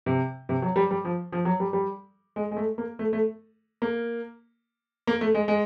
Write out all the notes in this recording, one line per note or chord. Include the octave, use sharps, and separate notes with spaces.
C3
C3
F#3
G3
G3
F3
F3
F#3
G3
G3
G#3
G#3
A3
A#3
A3
A3
A#3
A#3
A3
G#3
G#3